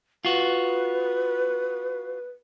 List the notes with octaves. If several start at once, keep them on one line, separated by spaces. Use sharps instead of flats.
F4 F#4 B4